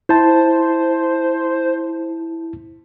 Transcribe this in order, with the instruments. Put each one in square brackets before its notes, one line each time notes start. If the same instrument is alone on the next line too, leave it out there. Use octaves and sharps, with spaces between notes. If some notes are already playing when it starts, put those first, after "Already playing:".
[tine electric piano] E4 A5 [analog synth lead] C5